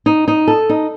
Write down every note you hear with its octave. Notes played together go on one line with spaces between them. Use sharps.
D#4
D#4
A4
D#4